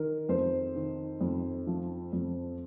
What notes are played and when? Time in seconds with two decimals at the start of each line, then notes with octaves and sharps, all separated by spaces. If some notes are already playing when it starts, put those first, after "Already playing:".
Already playing: D#3 A#4
0.29 F2 C5
0.76 D#3
1.21 F2
1.67 F3
2.13 F2